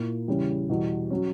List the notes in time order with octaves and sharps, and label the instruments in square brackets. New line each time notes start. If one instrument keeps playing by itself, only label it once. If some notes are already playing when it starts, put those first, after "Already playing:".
Already playing: [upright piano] A#2 A#3 E4
E2 C#3 G3 C#4 E4
E2 B2 G3
F#3 C#4